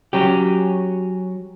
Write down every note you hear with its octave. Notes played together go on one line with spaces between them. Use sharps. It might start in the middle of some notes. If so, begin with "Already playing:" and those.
F#3 C#4 G4